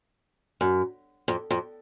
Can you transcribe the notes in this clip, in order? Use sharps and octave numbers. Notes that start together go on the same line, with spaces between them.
F#2
F2
F2